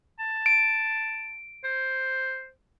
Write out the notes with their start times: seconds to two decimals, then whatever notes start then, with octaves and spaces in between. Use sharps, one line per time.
0.19 A5
0.46 D7
1.64 C5